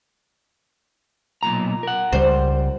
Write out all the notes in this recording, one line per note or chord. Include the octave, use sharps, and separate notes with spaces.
B1 A#2 A#5
A#4 F#5
C#2 G3 C5